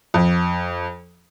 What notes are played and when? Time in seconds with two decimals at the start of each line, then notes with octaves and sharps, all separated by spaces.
0.14 F2